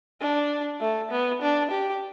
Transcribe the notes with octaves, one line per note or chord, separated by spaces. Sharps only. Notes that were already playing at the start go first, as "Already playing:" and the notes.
D4
A3
B3
D4
G4